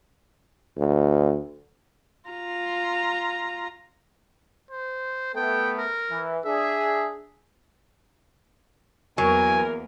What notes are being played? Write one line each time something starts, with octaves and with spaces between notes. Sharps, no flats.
D2
F4 A#5
C5
A3 B3 A4 G5
A#4
E3
D4 G#4 E5
E2 F#3 A#3 A#4 G#5